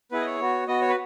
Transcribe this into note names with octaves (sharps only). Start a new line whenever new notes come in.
B3 E4 G#4 B4
D#5
C#5
B3 F#4
B3 F#4 D#5
C#5
B4